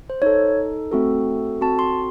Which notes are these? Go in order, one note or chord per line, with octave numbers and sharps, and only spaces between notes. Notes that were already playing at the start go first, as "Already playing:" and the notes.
C5
D#4 A4 C#5
A3 C4 F#4 A4
C4 F#4 A4 A5
C6